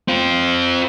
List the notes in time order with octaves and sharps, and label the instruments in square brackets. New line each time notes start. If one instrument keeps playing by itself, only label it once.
[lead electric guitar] C4 F4